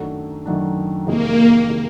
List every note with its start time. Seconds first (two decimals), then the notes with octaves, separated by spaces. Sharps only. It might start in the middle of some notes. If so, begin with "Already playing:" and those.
Already playing: F#2 D#3 F#3 A3 D4
0.46 F#2 D#3 F#3 A3 D4
1.07 F2 C3 D#3 G#3 A#3
1.68 C3 D#3 G#3